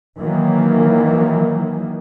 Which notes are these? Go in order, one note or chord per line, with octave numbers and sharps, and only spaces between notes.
D#3 E3 F#3 A#3